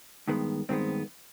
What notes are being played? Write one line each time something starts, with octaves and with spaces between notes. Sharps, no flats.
G2 D#3 G#3 B3
G2 D#3 G#3 B3 C4